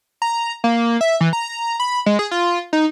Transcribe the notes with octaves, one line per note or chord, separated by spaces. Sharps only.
A#5
A#3
E5
E3
A#5
B5
G#3
G#4
F4
D#4